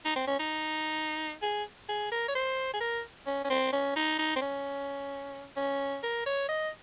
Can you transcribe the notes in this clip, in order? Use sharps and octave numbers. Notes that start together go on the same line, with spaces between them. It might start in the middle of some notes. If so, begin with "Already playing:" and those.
D#4
C4
C#4
D#4
G#4
G#4
A#4
C#5
C5
G#4
A#4
C#4
C#4
C4
C#4
D#4
D#4
C4
C#4
C#4
A#4
C#5
D#5